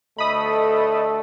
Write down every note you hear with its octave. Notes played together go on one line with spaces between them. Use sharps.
D2 A3 A4 D#5 B5 D#6